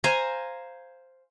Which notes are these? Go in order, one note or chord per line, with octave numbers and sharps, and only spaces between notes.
C5 F5 G#5 A#5